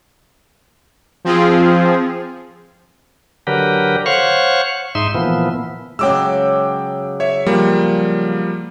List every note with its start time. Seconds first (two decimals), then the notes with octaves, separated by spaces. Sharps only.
1.25 F3 C4 F4 G#4
3.47 D3 F#3 G4 A#4 B4
4.06 C5 C#5 F5 F#5 C#6
4.95 G#2 D#4 E5 C6
5.14 A#2 E3 F3 B3
5.99 C#3 F#3 G#3 G5 D6 E6
7.20 C#5 E5
7.46 F3 G3 A#3